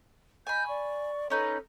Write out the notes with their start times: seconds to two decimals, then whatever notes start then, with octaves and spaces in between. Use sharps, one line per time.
0.47 D#5 G#5 B5 G6
0.68 D5 C#6
1.30 C#4 D#4 A4 B4 C#5